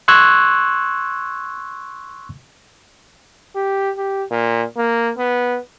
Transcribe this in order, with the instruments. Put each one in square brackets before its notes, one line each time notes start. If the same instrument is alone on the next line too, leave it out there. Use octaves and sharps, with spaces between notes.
[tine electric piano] C6 C#6 E6 F#6 G#6
[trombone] G4
G4
A#2
A#3
B3